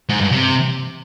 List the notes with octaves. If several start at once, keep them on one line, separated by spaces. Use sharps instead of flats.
G#2
G2
C3